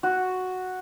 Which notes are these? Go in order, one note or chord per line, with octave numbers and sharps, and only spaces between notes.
F#4